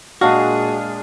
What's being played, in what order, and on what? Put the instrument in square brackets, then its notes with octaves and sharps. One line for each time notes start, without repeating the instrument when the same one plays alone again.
[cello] A#2 G#4 [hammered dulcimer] G#3 D4 F5 [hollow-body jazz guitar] F#4